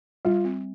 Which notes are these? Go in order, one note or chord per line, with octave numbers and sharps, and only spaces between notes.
G3 F4
C4